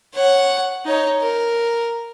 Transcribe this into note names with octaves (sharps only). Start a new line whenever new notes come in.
C#5 F#5
D#4 C#5
A#4